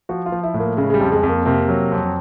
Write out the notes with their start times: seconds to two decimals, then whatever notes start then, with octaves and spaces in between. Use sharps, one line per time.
0.09 F3 F#4
0.26 F4
0.32 F3
0.43 E4
0.54 A2
0.60 A#3
0.77 C#3 G#3
0.90 G#3
0.94 G3
1.00 F2
1.12 G#3
1.23 F2
1.29 A#3
1.46 C3 A#3
1.69 F#3
1.92 F2